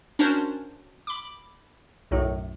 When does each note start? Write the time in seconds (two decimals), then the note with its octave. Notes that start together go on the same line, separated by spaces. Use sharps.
0.19 C#4 D4 F#4 A#4 C5
1.07 B5 D6
2.11 B1 F#2 A2